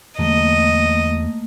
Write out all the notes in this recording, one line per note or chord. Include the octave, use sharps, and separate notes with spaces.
E2 D3 F#3 A3 A#3 D#5